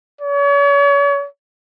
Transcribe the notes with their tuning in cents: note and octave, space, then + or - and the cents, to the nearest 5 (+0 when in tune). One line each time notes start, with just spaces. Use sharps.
C#5 +40